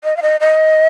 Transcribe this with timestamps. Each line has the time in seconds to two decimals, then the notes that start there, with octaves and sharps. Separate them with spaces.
0.04 D#5
0.17 F5
0.22 D#5
0.40 D#5